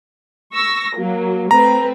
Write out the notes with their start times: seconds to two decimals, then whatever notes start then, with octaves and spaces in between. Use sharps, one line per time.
0.52 C#6 E6 A#6
0.96 F#3 A#3
1.51 A3 C4 B4 A#5